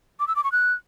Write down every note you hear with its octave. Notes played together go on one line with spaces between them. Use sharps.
D6
E6
D6
C#6
F#6